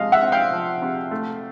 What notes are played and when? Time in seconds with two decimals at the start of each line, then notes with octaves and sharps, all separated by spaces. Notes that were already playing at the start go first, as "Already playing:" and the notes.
Already playing: C3 F3 G#3 D#5 F5
0.12 E5 F#5
0.22 C4
0.32 F5 G5
0.52 F3
0.82 C3
1.11 A3